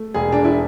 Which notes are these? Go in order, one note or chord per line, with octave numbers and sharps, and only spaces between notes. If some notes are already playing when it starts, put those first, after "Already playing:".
Already playing: A3
E1 G#4
D4
E4